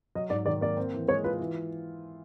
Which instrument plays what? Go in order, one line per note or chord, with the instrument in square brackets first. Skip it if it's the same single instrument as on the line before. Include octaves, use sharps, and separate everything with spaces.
[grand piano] F#3 [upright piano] D#5
[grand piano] G#2 [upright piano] D5
[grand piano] D#3 [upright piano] D5
[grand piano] A#3 [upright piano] D5
[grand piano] C4
E3
[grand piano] G#3 [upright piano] C#5
[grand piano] F4 [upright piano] B4
[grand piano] E3